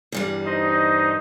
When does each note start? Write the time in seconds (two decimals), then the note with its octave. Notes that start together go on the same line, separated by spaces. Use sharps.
0.12 E2 G2 G3
0.46 D#4 C5 D#5